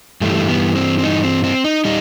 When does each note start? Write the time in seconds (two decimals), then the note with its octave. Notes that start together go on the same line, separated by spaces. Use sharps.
0.21 G2 E3 G3 A3
0.49 B3
0.76 C4
0.99 C4
1.03 D#4
1.24 C4
1.44 C4
1.64 D#4
1.85 G3 D#4